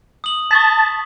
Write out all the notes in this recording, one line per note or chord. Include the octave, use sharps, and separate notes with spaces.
D#6 F#7
A5 C#6 D#6 B6